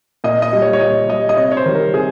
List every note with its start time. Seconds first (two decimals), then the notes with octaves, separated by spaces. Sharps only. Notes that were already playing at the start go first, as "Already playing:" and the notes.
0.24 A#2 D#5
0.42 D#5
0.53 G3
0.62 C#5
0.73 C#5
0.81 A#2 D#5
1.09 G3 D#5
1.29 D#5
1.37 C3 C#5
1.51 C#5
1.57 C5
1.66 D#3 G3
1.75 A#4
1.94 C3 G#4